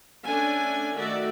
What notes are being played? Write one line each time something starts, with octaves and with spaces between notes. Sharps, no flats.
A3 C#4 D4 A4 G#5
D#3 A3 F#4 D5 E5